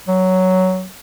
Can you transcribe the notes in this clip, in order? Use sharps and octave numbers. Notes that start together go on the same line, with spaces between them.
F#3